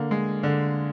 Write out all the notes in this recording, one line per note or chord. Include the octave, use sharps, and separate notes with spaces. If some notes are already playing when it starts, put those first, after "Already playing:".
Already playing: D3 A#3
G#3
D3